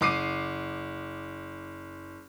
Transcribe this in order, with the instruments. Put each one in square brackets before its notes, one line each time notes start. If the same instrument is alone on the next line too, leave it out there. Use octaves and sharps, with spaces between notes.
[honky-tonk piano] F#1 D6 C7 D#7